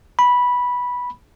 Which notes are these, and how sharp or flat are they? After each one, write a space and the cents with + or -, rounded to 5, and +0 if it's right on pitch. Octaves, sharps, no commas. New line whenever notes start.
B5 -10